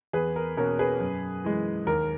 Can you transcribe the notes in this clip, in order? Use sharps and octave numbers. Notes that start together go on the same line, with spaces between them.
E2 G#4 B4
A#4
B2 A#3 C#4 A#4
G#4 B4
F#2
E3 G#3
D#2 A#4